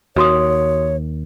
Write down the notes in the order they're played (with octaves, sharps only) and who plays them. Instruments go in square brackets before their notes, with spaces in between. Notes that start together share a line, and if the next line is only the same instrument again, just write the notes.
[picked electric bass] D#2 [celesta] F#4 C6 D#6 [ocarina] C#5